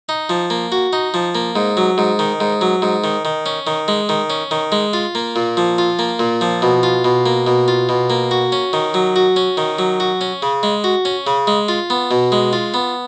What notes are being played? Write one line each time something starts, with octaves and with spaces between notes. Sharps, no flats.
D#4
F3
A#3
F#4
D#4
F3
A#3
G#2
F#3
G#2
D#3
G#2
F#3
G#2
D#3
D#3
C#4
D#3
G#3
D#3
C#4
D#3
G#3
F4
A#3
A#2
F3
F4
A#3
A#2
F3
B2
F4
B2
A#3
B2
F4
B2
A#3
F#4
C#4
D#3
F#3
F#4
C#4
D#3
F#3
F#4
C#4
C#3
G#3
F#4
C#4
C#3
G#3
F4
B3
B2
G#3
F4
B3